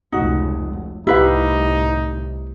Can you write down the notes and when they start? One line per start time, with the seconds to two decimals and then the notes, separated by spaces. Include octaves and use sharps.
0.12 F1 C#2 D#4 F#4
1.07 C2 A2 D#4 E4 G4 B4 F5